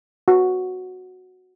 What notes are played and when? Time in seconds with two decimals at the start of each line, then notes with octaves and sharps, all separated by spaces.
0.28 F#4